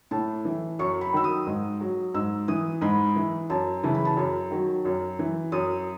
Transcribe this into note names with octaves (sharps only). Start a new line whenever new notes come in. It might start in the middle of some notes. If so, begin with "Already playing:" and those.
A2 A5
E3
F#2 C#6
B5
D#3 F#3 E6
D#6
G#2
F#3
G#2 E6
E3 D#6
G#2 B5
E3
F#2 A5
C#3 E3 A5
B5
A5
F#2
D#3 F#3
F#2
E3
F#2 D#6